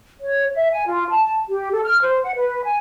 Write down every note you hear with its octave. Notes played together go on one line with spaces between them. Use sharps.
C#5
E5
G#5
F4
A5
G4
A4
F6
C5
F#5
B4
G#5